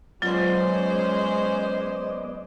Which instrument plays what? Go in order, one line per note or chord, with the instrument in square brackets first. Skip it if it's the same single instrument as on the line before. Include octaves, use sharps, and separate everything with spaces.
[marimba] F#3 F4 [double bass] G#3 [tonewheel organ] B3 D5 D#5 [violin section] C#4 C5